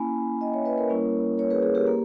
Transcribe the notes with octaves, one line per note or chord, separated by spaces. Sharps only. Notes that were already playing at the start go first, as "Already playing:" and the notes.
Already playing: A#3 C#4 E4 G#5 B5
D#5 G5
C#5 E5
B4 D#5
A#4 C#5
G3 A#3 C#4 E4
A#4 C#5
G#4 B4
G#4
G4 A#4
A#3 G4